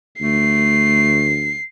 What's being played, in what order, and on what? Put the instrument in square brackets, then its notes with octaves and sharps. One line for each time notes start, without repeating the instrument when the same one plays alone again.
[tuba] D2 [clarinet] A3 [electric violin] C7